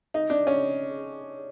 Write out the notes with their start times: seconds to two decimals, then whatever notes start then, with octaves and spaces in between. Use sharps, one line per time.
0.14 D#4
0.30 D4
0.47 C#4